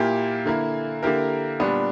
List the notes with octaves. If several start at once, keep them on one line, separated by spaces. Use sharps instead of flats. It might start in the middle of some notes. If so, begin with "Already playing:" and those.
Already playing: A#2 A#3 E4 G4
D3 A#3 E4
D3 A#3 E4 G4 A#4
A#2 G3 B3 D4